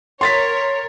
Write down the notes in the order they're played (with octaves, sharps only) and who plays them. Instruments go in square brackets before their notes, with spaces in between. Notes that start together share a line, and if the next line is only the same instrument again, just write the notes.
[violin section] A#4 C#5 [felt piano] C6 A6 B6